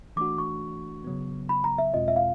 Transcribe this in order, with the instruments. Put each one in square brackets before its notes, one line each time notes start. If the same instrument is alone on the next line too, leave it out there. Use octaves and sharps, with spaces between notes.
[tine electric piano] E3 A3 D4 F#4 [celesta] D6
[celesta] C#6
[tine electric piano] C#3 F#3 B3
[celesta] B5
A#5
E5
[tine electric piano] E2 B2 G#3 C4 F4 [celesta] D#5
[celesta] E5
F5